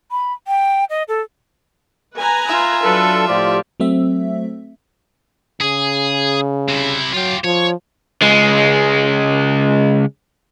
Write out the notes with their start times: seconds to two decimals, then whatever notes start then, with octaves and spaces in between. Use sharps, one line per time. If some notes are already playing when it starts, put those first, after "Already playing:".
0.11 B5
0.47 G5
0.90 D#5
1.08 A4
2.17 B4 G#5 A#5
2.46 F4 E5
2.82 F#3 D4 A4 B4
3.27 A2 F3 G4 D5
3.80 F#3 A3 C4 E5
5.61 C#3 G#4
6.69 C3 E4
7.13 F#3 F4 G4
7.44 F3 C#5
8.22 C#2 G#3